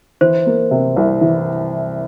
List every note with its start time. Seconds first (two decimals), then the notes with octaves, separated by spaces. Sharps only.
0.21 E3 C5
0.46 A#3
0.71 C3
0.96 C2
1.21 E3